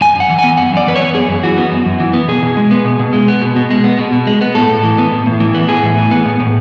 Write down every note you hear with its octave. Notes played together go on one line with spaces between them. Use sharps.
F#2 G#5
F#2 F#5
E3
G#5
B3
F#2 F#5
F#2 D5
E3 B4
C#5
B3
F#2 G#4
F#2
E3 F#4
B3
F#2
F#2
E3
B3
B2 G#4
B2
G#3
B3
B2
B2
G#3
B3
B2
B2
G#3
B3
B2
B2
G#3
B3
A2 A4
A2
E3
B3
A2
A2
E3
B3
A2 G#4
A2
E3
B3
A2
A2